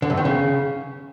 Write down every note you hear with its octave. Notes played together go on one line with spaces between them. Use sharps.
D3
F#2
D#3
C#3